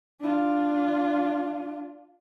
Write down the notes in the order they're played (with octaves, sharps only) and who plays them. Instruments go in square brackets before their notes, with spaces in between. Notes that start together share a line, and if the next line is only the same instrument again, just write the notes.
[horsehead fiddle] D4 F4